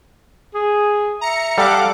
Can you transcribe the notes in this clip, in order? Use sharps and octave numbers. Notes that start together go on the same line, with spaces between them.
G#4
E5 A#5 C#7
G3 A4 F5 F#5 D6